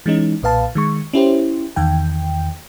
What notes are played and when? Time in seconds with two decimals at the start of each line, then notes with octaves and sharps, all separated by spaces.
0.06 E3 G#3 C#4 D#4
0.42 B1 A#2 B4 F5 A5
0.75 D#3 G#3 C#6
1.13 C#4 E4 G4 C5
1.76 E2 D#3 G5